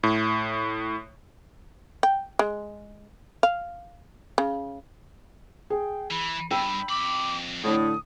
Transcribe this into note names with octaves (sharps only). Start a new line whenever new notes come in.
A2
G5
G#3
F5
C#3
G#4 G5
E3 B5
G2 G5 B5 E6 D#7
F2 B5 D6
A2 D3 D#6